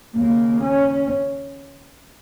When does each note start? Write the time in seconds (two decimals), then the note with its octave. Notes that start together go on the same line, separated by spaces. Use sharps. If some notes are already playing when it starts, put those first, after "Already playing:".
0.15 D#2 C#3 A#3
0.61 C#4